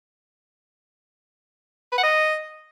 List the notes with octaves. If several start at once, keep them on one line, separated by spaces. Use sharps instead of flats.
B4
F#5
D#5